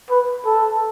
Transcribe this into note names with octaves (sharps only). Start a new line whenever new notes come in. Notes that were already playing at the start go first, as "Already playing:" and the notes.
B4
A4